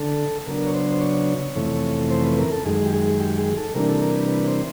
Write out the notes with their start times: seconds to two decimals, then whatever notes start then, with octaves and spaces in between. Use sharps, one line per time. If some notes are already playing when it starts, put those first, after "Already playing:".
Already playing: D3 A4
0.46 C#3 F#3 B3 D4 A#4
0.67 C#5
0.74 C5
0.91 C5
1.01 C#5
1.56 F2 C3 E3 A3 C#4
2.11 C5
2.24 B4
2.38 A#4
2.52 A4
2.65 F#2 D#3 G#3 G#4
2.85 G4
2.93 G#4
3.20 G4
3.38 G#4
3.57 A4
3.75 C3 E3 G3 A#3 D4 A#4
3.88 A4
4.02 A#4
4.16 B4
4.29 B4
4.47 C5